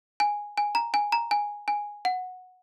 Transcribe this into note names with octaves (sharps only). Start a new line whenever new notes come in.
G#5
G#5
A#5
G#5
A#5
G#5
G#5
F#5